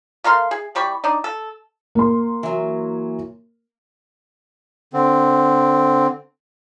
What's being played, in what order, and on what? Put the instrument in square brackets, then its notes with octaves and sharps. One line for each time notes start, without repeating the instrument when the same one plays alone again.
[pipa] A3 A#4 F5 C6
G#4
E3 G3 B5 C#6
D4 D#4
A4
[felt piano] A#3 C6
[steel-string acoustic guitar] E3 F#3
[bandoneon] D3 C4